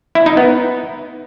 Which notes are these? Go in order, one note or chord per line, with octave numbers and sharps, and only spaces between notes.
E4
D#4
B3